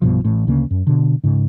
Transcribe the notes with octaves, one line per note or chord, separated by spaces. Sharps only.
B1 G2 B2 F3
A1 A2
D2 C#3 A#3
F#2
B2 D3
G#2 C#3